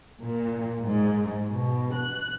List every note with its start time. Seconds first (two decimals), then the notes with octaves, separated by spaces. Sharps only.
0.23 A#2
0.82 G#2
1.52 B2
1.95 F#6